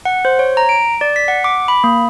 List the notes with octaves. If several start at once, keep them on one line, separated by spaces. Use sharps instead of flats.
F#5
C5
C#5
A#5
D7
D5
B6
F#5
D6
B5
A#3